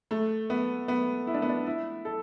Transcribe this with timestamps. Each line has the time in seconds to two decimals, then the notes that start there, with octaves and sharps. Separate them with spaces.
0.11 A3
0.50 B3
0.88 B3
1.27 E4
1.34 D4
1.42 B3
1.49 D4
1.67 E4
2.05 A4